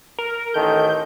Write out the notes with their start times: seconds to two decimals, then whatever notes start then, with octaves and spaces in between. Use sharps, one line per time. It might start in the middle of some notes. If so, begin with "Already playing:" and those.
0.18 A#4
0.54 A1 D#3 A4 G6